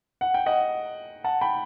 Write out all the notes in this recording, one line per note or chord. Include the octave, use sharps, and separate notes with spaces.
F#5
G5
D#5 F#5
F#5 A5
G5 B5